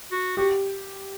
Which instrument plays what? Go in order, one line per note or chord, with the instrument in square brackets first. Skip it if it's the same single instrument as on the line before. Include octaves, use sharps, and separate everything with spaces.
[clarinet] F#4
[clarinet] F#4 [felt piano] G4